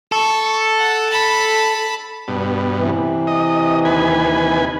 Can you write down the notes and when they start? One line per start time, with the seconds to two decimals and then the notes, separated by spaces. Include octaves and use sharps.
0.12 A4 C#6
0.78 F#5
1.10 A5 B5
2.28 G2 B2
2.77 C3 E3
3.27 D#5
3.85 D#2 B4 G#5